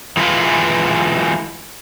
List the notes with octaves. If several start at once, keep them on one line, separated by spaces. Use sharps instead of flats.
E3 G#3 E4 F4 B4